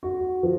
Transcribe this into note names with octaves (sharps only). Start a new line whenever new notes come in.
F#4
F3